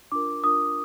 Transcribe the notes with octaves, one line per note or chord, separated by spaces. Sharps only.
D4 F4 A#4 D6
D4 F4 A#4 D#6